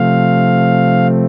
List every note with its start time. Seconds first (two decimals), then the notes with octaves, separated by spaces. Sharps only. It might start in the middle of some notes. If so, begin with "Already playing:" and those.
Already playing: C3 F3 A3 C4 F5